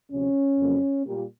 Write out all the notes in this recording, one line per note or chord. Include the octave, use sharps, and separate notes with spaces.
D2 C3 F3 C#4
F2 C#3 F#3 A#3
A#2 G3 A#3